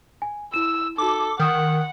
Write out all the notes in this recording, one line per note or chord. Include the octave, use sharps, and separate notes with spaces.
G#5
E4 E6 E7
D#4 F#4 A4 D6
D#3 F#5 D#6 F6 G6